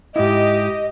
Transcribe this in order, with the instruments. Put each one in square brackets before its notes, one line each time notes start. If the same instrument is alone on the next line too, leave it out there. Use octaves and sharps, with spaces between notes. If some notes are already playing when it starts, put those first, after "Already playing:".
[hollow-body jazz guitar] G#2 E4 [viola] G4 [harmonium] D#5